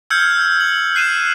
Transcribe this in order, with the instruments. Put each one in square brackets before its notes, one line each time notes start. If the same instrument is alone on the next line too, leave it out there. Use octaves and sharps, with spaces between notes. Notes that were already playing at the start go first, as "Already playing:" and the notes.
[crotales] E6 F6 G6 G#6 C#7
F#7
F#6 C7 D#7 E7